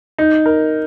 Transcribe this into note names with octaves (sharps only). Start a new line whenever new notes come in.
D#4
A#4